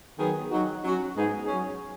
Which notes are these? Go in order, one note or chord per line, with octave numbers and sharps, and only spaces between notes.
D#3 F#3 B3 G#4
F#3 D#4 F#4
F#3 C#4 F#4
G#2 G#3 B3 D#4 G#4
F#3 C#4 G#4